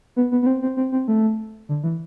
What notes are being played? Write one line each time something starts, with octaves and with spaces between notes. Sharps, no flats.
B3
B3
B3
C4
C4
C4
C4
A3
D3
E3